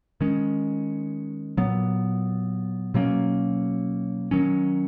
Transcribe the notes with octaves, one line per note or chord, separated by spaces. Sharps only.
D#3 G#3 C#4
A#2 F#3 B3
B2 F#3 A#3 C#4
D#3 F#3 C#4